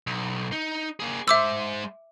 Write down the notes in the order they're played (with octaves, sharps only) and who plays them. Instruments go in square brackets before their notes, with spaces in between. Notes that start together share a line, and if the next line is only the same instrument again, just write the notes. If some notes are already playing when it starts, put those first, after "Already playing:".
[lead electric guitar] B1
D#4
A#3 G#4
[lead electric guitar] G#3 C5 [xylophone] E5 D6 E6